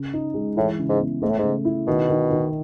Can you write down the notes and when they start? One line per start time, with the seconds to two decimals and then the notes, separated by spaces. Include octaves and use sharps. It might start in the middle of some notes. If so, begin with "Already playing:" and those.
Already playing: C#3
0.13 D#4
0.34 G#3
0.56 A2 E3
0.79 C#3
0.89 G#2
1.00 B3
1.22 G#2 A3
1.30 A2
1.38 G#2 C#3
1.65 E4
1.87 B2 D#3
2.09 D#3
2.31 D#3